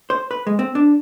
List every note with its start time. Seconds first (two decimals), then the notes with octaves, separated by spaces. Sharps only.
0.10 C5
0.31 B4
0.47 G#3
0.59 C4
0.75 D4